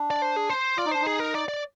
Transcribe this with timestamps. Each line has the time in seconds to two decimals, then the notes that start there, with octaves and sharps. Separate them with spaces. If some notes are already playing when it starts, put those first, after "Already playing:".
Already playing: D4
0.11 D5
0.22 C5
0.36 G#4
0.50 C5
0.77 F4 D5
0.86 D#4
0.91 D4 C5
1.02 D#4 G#4
1.19 A#4
1.34 D5
1.48 D5